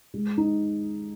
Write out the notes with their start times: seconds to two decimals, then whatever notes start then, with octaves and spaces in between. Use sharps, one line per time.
0.14 G#3
0.37 D#4